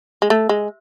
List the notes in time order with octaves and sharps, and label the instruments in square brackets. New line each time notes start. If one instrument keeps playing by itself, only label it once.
[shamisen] G#3
A3
G#3